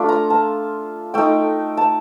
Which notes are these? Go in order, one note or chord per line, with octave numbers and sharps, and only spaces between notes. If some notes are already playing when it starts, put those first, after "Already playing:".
Already playing: A3 D4 F4
A#5
A5
A3 D#4 G5
A5